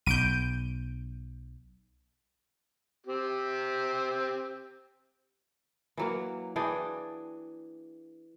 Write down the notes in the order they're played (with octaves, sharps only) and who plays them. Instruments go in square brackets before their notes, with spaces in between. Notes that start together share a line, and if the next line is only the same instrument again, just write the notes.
[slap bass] B1 [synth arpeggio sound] G6 D7 D#7
[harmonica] C4 G4
[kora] E3 F#3 A#3
E3 D4 G#4 G5